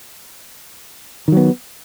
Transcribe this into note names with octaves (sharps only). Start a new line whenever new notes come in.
D#3 F#3 B3